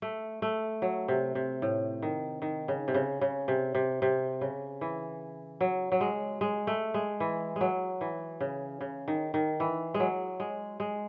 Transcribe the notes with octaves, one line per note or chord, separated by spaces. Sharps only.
A3
A3
F#3
C3
C3
A2
D#3
D#3
C#3
C3
C#3
C#3
C3
C3
C3
C#3
E3
F#3
F#3
G#3
G#3
A3
G#3
E3
F#3 G#3
E3
C#3
C#3
D#3
D#3
E3
G#3
F#3
G#3
G#3